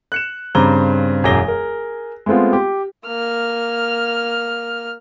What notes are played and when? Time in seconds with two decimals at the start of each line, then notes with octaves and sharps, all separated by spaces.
0.12 F#6 C#7 E7
0.55 G2 C#3 C4 A#5 D6 G7
1.23 E1 F#2 G#4 D6 A#6 G7
1.44 G#4 A#4
2.26 G#3 A3 B3 C4 F4
2.53 G4
3.07 A#3 F6